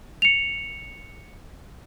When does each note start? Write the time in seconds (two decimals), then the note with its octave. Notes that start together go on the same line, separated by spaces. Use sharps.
0.22 C#7 F7